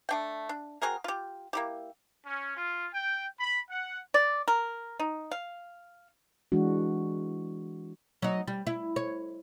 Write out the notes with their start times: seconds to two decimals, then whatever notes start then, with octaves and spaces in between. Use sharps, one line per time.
0.09 A3 D4 G5
0.49 D4
0.82 C4 F#4 G#4 A#4
1.04 F4 G4
1.53 A#3 E4 G4
2.26 C#4
2.57 F4
2.94 G5
3.40 B5
3.69 F#5
4.14 D5
4.48 A#4
4.99 D#4
5.31 F5
6.52 E3 G#3 D4 F#4
8.22 F#3 D#4
8.48 G3
8.67 E4
8.96 C#5